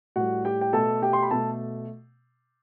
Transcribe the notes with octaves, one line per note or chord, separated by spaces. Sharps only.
A2 G3 F#4 F#5
G4 G5
G5
B2 A3 A4 A5
G4 G5
C6
B5
B2 A3 A4 A5